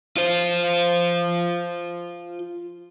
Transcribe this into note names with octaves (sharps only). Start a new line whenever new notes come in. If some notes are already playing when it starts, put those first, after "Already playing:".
F4 C5